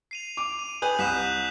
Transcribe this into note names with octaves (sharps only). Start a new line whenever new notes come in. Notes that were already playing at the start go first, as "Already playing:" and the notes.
C7 D#7 F7
D6
D#7
B4 G#5 D#6 G6 F#7
C2 F#6 B6 E7